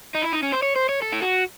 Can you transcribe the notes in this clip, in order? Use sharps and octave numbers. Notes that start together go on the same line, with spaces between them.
D#4
E4
D#4
C#4
C5
C#5
C5
C#5
A4
E4
F#4